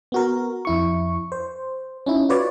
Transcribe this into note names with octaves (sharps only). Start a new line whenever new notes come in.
B3 F#4 A#4
F2 E4 C#6
C5
C#4 D#4 E4
F4 F#4 B4 C#5 D5